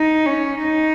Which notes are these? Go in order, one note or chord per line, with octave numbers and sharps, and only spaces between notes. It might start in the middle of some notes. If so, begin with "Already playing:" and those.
Already playing: D#4
C#4
D#4